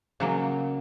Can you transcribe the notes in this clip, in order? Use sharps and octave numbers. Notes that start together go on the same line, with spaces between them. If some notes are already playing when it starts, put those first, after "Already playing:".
C#3 F#3 A#3